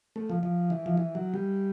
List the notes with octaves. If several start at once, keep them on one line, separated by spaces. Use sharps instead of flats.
A3
F3
F3
E3
F3
E3
F#3
G3